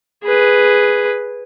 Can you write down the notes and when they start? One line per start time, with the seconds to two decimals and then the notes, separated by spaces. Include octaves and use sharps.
0.24 G#4 B4